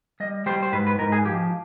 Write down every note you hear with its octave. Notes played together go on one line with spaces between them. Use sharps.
G3 D#5
G3 C5
C5
G#2 B4
B4
G#2 A#4
G#4
F3 G4